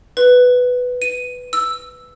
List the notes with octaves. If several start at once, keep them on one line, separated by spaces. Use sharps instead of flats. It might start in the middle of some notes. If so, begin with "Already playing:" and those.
B4
D#7
E6